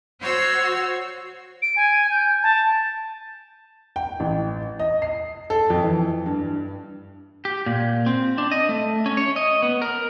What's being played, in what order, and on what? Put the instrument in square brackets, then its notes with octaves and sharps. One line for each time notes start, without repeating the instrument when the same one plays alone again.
[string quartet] F#4 C5 C#5 C6 E6
[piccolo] D7
G#5
G6
A5
[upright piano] G5
A1
D#5
C7
A4
F2
E3
G2
[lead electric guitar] G4
A#2
C4
D4
D#5
A3
C#4
C#5
D#5
B3
A#4